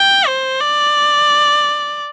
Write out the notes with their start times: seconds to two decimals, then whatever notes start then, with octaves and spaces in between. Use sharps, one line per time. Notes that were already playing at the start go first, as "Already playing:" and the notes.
Already playing: G5
0.27 C5
0.61 D5